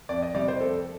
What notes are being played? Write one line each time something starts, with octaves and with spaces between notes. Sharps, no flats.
F2 D5
D#5
C3 G3 D5
C5
F2 A4